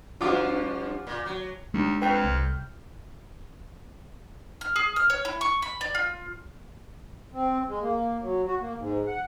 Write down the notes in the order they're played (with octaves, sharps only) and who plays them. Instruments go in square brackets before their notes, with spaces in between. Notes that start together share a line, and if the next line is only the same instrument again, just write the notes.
[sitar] G2 F3 C#4 [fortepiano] F4 F#4 D6
[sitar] A#2
F#3
[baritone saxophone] D#2 [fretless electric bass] G#3 D4
[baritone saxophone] F2 [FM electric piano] B4 G5
[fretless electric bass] C2 [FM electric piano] F6 G6
[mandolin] F6
G#4
F6
C#5
E4
C#6
B5
D5
F4
[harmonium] C4
G#3
A#3
F#3
F#4
A#3
G#2
F#5